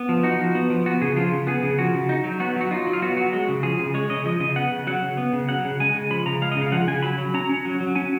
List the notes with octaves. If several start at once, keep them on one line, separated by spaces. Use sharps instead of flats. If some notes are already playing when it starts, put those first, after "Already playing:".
Already playing: B3
F3
D#4 F#4
F3
B3
F3
B3 F#4
C#3 G#4
F3 F4
C#3
B3 G#4
C#3
F3 F#4
C#3
D#4
F#3
B3 F#4
F#3 F#4
D#4 F4
F#3
F4
B3 F#4
F#3 F#4
G#3 F#4
C#3
F3 G#4
C#3
G#3 C#5
C#3 D#5
F3 D#5
C#3 D#5
B3 F#5
C#3
F#3 F#5
C#3
B3
C#3
F#3 F#5
C#3
G#3 G#5
C#3
F3 B5
C#3 A#5
G#3 F5
D#5
C#3
F5
F3 F#5
C#3 G#5
F#3 B5
F#3
C#4 A#5
C#4
F#3
F#3
C#4 G#5